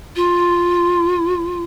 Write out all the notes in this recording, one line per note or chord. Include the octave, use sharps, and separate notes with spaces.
F4